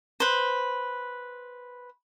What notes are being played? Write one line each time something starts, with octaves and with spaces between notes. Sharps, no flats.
B4 C5